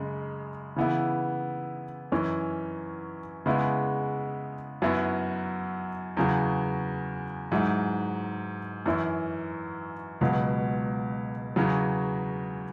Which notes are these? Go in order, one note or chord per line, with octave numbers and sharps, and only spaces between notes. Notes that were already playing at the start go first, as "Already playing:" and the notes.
Already playing: F#2 C#3 G#3
C#3 E3 B3 E4
F#2 E3 C#4
C#3 G#3 B3 E4
F#2 F#3 B3 E4
E2 C#3 F#3
G#2 F#3 E4
F#2 E3 C#4 E4
C#2 B2 F#3
E2 C#3 F#3